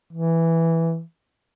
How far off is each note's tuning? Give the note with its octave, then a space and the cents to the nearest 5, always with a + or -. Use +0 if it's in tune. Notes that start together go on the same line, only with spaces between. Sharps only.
E3 +0